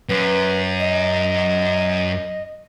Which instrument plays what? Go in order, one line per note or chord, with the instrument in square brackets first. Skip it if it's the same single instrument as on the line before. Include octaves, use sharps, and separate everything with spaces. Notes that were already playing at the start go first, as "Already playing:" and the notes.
[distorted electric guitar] F#2 [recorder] B4
[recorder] D#5